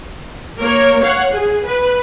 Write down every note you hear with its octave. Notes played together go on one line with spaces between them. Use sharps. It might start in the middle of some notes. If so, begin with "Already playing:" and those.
A#3 A#4 C#5
C#5 F5 F#5
G#4
B4